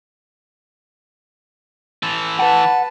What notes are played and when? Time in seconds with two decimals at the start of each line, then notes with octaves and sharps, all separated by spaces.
2.03 E3 A4
2.39 B4 F#5 A5